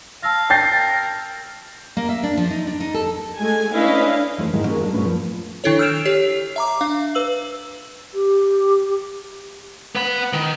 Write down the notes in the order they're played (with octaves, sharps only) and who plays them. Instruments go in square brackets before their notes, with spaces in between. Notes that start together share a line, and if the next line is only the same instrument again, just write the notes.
[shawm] F5 [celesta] A5 E6 A#6
[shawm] A#4 [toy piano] G5 [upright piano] G6 A6 C7
[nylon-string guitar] A#3
E5
D4
F3
D#4
D4
D#4
A4
[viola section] G#3 A3 G#5
C#4 D4 E4 B4 D#5 F5
[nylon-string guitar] E3 A3 C5
G#2 D#3 G#3 A#3 E4
C#4 F#4 G#4 A#4
G3 A#3 D4 D#4 A4
G2 A#2 F3 A3 C#4 B4
F3
[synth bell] D#3 D4 E4 A4 C#5
E6 F6 G6 D7 E7 F7
G4 C#5 C7
E5 A#5 D6
D4 F5
B4 E6 F#7
[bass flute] G4
[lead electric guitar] B3 B5
D#3